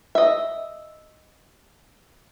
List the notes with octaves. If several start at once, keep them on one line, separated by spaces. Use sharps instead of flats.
D#5 E5